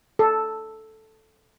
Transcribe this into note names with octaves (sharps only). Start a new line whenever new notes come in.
A4